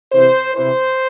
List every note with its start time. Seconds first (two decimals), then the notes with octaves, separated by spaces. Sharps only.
0.12 C3 E3 C5
0.54 C3 E3 C5